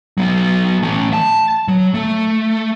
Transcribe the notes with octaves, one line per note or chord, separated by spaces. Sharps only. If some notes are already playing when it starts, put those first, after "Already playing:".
F#3 B3
E3 A3
A5
F#3
A3